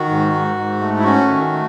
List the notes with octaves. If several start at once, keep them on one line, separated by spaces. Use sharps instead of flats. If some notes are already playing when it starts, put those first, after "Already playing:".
Already playing: D#3 F#4
G#2
G#2
G#2
A3
E4
C#4 F#4
D#3
A3